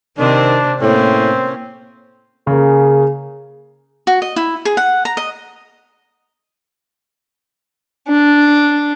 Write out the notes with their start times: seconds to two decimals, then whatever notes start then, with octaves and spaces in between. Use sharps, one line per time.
0.18 C3 D#3 C4 D4
0.81 A2 A#3 C4 C#4
2.47 C#3 A#3 G#4
4.07 F#4
4.22 D#5
4.36 E4
4.65 G#4
4.77 F#5
5.05 A#5
5.17 D#5
8.08 D4